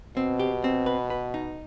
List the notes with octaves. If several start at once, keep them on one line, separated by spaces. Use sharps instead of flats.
B2 C4
G4
C4
B4
B4
D#4